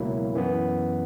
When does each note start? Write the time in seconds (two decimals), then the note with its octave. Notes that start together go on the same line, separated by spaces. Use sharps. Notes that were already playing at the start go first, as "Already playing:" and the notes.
Already playing: C#2 B2 F#3 A#3 E4
0.34 F#2 E3 B3